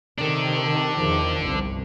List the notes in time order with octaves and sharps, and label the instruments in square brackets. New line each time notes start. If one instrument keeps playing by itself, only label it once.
[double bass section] C3 D#3 [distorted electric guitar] D4 A4
[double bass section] E2 D#3 F3
G1 C2